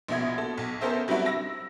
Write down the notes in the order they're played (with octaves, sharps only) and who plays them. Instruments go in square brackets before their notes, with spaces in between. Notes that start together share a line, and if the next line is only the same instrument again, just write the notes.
[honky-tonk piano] A#1 B2 E4 G#6
B2 A4
B1
B3 C#4 A4 A#4 C5 E5
F#3 G3 C4 D4 E4 F#4
E6 A#6